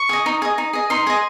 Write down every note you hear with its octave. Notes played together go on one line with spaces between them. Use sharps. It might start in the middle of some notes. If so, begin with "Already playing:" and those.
Already playing: C#6
G#4 D#5
D#4
G#4 D#5
D#4
G#4 D#5
D#4 C6
G#4 D#5